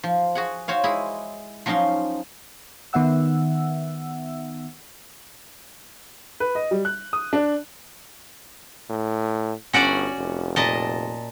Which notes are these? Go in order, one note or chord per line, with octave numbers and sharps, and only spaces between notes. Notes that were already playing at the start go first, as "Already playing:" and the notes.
F3
F#4 G#4 F#5
F#4 C5 C#5 F5
G#3 E4 G#4
F3 F#3 C#4 D#4 F5 C6
D#3 B3 E5 F#5 E6
B4
D#5
G3
F#6
D#6
D4
A2
G1 C#4 F#4 D5
F1
A#2 D#5 A5